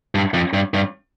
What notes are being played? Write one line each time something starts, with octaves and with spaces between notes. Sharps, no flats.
G2
F2
G2
G2